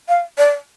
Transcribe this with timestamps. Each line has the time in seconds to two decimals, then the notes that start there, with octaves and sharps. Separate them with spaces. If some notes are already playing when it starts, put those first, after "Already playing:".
0.09 F5
0.38 D5